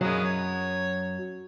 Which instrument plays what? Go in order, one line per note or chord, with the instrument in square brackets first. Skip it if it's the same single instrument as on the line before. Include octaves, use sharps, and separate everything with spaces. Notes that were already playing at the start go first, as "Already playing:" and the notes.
[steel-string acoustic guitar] F#2 F#3 [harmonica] G#3 B3 F5
[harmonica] C#5